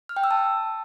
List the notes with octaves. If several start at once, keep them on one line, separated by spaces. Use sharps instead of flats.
F6
G5
E6
A5